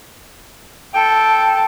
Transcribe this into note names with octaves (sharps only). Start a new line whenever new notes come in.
A4 G5